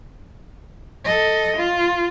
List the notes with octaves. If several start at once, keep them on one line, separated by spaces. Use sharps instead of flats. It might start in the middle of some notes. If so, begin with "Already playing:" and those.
A4 D#5
F4